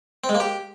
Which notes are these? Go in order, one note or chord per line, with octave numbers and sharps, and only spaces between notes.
C4
G#3
A#3
G4